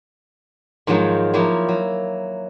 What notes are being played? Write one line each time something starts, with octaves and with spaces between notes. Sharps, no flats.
G#2 D#3 F3 F#3 G#3
F3 F#3 A#3 E4
F#3